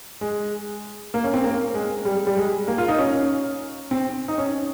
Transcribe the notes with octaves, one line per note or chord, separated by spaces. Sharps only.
G#3
A#3
C#4
C4
A#3
G#3
G3
G3
G#3
A#3
F4
D#4
C#4
C4
D#4
C#4